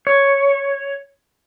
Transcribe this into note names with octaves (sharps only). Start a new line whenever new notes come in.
C#5